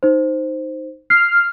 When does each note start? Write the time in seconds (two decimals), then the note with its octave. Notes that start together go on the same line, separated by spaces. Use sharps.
0.03 D#4 C5
1.10 F6 C7